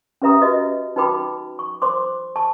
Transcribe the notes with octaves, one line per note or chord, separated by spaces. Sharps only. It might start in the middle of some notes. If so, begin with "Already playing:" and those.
C#4 G4 B4 E5 A#5 D#6
F#4 B4 D#5
D#4 F#4 B4 G5 B5 D6
C#6
C5 C6 D6
A5 C#6